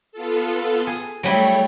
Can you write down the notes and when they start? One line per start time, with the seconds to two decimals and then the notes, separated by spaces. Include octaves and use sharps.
0.12 B3 F4 A4
0.87 G#4
1.23 F#3 G3 A3 E4 C#5